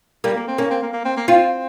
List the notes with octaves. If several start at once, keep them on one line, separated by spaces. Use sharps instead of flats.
G3 A#3
A#3
C4
A#3 C#4
C4
A#3
A#3
C4
A#3
C4 F4